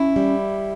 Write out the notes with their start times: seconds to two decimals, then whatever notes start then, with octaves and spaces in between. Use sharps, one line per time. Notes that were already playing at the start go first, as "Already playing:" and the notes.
Already playing: C#4 E4
0.16 G3